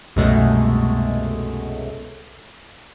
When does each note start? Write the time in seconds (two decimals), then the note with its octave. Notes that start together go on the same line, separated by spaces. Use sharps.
0.16 C2 F#2 B2 G#3 A3